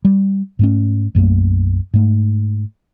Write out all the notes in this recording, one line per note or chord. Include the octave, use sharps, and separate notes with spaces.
G3
G#2 A3 C#4
B1 F#2 A3 A#3
G#2 A3